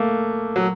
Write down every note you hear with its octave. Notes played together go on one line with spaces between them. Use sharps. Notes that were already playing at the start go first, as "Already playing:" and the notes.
Already playing: A3 A#3
F#3